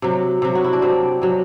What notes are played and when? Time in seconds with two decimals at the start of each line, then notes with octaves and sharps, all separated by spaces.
0.02 C3 F#3
0.42 C3 F#3
0.55 F#4
0.64 E4
0.73 D4
0.82 C3 F#3 C4
1.22 C3 F#3